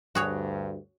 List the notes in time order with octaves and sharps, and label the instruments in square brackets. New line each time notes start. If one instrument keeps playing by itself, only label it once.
[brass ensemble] D2 G2 [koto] F#4 G#4 C#5